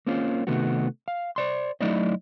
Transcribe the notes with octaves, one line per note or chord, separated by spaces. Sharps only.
A#3 C4 C#4 F4
C3 D#3 A3 B3 F#4
F5
C5 D5 C6
F#3 A3 D#4 E4 D5 D#5